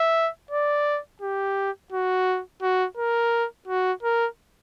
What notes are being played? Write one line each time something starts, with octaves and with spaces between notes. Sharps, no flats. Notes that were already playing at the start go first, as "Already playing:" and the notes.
Already playing: E5
D5
G4
F#4
F#4
A#4
F#4
A#4